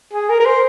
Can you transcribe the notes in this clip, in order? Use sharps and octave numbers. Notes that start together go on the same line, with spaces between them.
G#4
A#4
A#4
C5